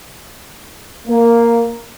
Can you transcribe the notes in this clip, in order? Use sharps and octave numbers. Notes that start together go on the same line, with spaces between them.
A#3